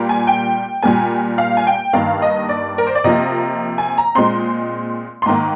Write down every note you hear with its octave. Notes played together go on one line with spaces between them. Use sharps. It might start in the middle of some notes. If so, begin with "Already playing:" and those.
Already playing: A#2 G3 A#3
G#5
G5
A#2 G3 A#3 G#5
F5
G#5
G5
G2 D#3 A#3 F5
D#5
D5
A#4
C5
D5
C3 F3 A#3 D#5
G#5
A#5
A#2 G#3 C4 C6
C6
G#2 D#3 A#3 A#5